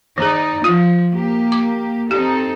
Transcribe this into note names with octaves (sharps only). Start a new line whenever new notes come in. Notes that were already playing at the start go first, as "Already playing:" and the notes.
D#3 D#4 G#4 D5
F3 F4
A#3 G4
D6
C4 D#4 G4 A4